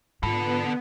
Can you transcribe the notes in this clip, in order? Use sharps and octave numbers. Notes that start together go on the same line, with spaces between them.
G#2 D3 B3 F4 A4 B5